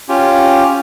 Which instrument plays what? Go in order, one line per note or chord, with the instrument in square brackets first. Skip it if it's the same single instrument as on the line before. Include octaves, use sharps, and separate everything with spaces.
[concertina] C#4 F4 G4